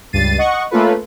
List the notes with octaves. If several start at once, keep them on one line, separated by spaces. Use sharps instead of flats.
C#2 G2 A6 C7 D#7
D#5 F#5 C#6
A3 A#3 C#4 F4 A4 B4